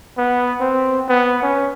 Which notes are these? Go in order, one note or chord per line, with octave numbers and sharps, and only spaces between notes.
B3
C4
B3
C#4